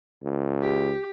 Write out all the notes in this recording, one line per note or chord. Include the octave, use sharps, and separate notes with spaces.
C#2
G4